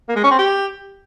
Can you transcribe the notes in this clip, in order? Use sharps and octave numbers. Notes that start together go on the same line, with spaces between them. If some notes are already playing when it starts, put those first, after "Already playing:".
A#3
G#3
C#4
C4
G4